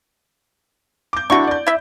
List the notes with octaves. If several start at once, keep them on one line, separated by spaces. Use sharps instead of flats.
D6 G6
D3 D4 E4 F#4 C#6
D5 G6
E4 E5